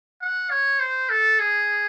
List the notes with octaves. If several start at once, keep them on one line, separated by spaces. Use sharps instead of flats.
F#5
C#5
C5
A4
G#4